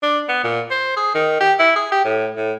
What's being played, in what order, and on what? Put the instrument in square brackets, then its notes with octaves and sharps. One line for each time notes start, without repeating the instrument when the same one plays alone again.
[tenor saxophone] D4
B3
A#2
C5
G#4
D#3
G4
E4
G#4
G4
A2
A2